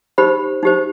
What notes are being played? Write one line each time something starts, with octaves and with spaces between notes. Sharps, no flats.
D#4 G4 C5 B5
D#4 G4 C5